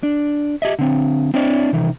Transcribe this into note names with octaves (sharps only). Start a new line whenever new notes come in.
D4
G4 D#5 E5
D3 C4
C4 D4 E4 C#5 D5
C3 D#3 E3